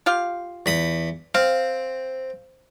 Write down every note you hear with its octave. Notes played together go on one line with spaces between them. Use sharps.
F4 G4 F5
E2 B5 D#6
C4 F5